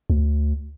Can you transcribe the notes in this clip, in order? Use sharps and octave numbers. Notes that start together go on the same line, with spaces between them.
D2